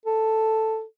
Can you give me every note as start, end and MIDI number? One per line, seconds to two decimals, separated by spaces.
0.06 0.84 69